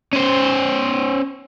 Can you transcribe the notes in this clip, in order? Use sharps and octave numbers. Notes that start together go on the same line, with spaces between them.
C#4 C5